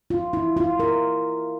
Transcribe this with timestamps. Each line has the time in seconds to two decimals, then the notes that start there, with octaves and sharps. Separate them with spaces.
0.10 F4
0.33 E4
0.57 F4
0.80 A#4